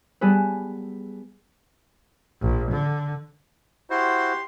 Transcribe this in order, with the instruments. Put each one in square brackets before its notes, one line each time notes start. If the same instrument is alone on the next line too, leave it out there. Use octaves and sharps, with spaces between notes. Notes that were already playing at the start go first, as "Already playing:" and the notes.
[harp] G3 B3 G#4 A4 B4
[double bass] A#1
D3
[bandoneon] E4 F#4 C5 [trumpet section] G4 C6